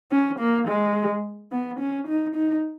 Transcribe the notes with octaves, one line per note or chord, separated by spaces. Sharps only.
C#4
A#3
G#3
B3
C#4
D#4
D#4